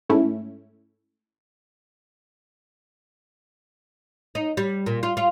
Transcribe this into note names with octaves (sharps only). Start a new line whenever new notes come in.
G#2 A3 C#4 E4
D#4
G3
A#2
F4
F4